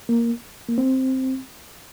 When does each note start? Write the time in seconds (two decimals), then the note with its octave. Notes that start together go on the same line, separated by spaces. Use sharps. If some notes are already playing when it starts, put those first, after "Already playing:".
0.09 A#3
0.69 A#3
0.78 C4